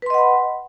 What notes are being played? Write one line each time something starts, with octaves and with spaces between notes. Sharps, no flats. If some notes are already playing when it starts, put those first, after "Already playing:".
B4 D#5 F#5 B5 C6